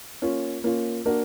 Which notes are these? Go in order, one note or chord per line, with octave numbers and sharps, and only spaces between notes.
A#3 C#4 F4
A#3 C#4 F4
A#3 D4 F#4 A#4